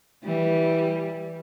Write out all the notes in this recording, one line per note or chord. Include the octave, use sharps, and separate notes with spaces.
E3 G3